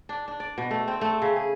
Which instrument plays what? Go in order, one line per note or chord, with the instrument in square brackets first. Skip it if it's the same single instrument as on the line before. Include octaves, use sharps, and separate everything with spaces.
[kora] D4
D4
D5
B2
A3
C4
A3
C#3
G#4